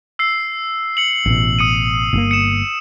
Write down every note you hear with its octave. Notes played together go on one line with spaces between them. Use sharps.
E6 C7
C#7 F#7
A1 B2
D#6 C#7 D#7
G1 A#3
C#7 E7